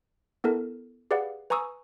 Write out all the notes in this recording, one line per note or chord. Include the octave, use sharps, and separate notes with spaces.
B3 E4 A4 A#4
G4 G#4 B4 D5 F5 F#5
B4 G#5 A#5 C#6 D#6 E6